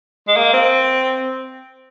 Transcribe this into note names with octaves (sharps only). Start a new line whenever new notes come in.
G#3
A#3
C4